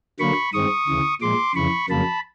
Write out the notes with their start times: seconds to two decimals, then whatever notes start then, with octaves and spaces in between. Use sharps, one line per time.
0.19 D3 F#3 A#3 B5 C#6
0.53 G2 D#3 G#3 C4 C#6 D#6
0.88 D2 C#3 E3
1.21 A#2 F3 G#3 C6 D6
1.55 F2 C#3 E3 B5 C#6
1.89 F2 C#3 F#3 A#3 A5 B5